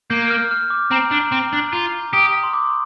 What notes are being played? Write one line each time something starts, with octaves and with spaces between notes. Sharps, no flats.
A#3 G6
F6
F6
D6
C4 A#5
D4
C4
D4
F4 A#5
G4 D#6
C6
D6